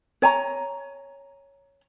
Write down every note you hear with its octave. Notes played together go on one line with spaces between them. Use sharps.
C#5 G#5 A#5